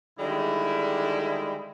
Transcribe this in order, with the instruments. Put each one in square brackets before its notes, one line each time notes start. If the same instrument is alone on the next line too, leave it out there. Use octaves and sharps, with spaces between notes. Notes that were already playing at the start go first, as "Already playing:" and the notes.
[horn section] D3 D#3 G3 G#3 E4